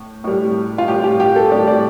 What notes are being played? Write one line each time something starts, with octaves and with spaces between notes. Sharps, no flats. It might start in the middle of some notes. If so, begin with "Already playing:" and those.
Already playing: A2
A2 G3
F4
A2 G3 G4
G4
G4
A4
A2 G3 D5
D5